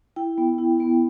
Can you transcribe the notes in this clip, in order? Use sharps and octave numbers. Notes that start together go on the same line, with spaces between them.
E4 G5
B3
E4
B3